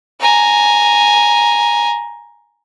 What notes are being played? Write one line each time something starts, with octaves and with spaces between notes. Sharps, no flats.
G#5 A#5